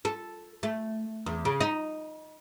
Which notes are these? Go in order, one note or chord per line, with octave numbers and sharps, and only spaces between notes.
A4
A3
E2
C#3
D#4